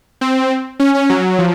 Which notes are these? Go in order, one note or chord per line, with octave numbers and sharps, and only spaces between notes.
C4
C#4
C#4
F#3
F3